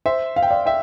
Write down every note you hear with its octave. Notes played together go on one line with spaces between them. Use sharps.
C5 E5
F5
G5
D5 F5
E5 G5